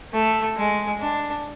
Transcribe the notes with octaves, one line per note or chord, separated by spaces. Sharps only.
A3
G#3
D4